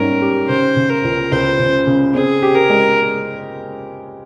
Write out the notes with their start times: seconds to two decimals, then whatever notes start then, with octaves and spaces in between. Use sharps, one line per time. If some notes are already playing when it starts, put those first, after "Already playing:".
Already playing: G#2 G3 C#4 A#4
0.22 G4
0.48 C#3 C5
0.76 C#3
0.90 A#4
1.04 C#2
1.32 C#2 C5
1.59 C#3
1.87 C#3
2.14 C4 G#4
2.42 G4
2.55 A#4
2.70 G#3